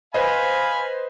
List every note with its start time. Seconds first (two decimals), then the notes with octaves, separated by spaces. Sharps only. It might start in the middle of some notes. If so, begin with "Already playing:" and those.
0.14 B4 C5 D#5 F5 G#5 B5